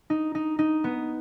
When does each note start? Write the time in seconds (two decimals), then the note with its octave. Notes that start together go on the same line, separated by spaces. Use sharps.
0.10 D#4
0.35 D#4
0.59 D#4
0.84 B3